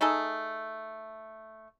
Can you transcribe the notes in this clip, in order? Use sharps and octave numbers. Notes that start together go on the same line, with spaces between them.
A3 D#4 G#4 A4